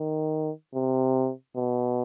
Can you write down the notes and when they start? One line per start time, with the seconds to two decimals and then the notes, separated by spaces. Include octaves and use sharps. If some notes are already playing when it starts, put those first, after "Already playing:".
Already playing: D#3
0.74 C3
1.56 B2